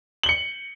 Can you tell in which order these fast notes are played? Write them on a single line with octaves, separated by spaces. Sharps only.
F#7 G7 C#7